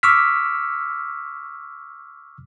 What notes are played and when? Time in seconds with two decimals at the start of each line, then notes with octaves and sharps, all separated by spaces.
0.03 C#6 D6 E6 F6 B6